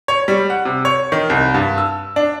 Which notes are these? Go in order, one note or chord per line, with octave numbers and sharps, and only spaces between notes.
C#5
G3
F#5
C3
C#5
D#3
C2
G2
E6
D4